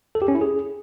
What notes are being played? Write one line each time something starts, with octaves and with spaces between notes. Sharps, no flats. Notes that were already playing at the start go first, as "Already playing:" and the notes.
A4
G4
C#4
E4
G#4